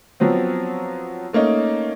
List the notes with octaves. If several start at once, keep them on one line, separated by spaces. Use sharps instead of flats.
F3 F#3 B3 C4
A3 A#3 C#4 D#4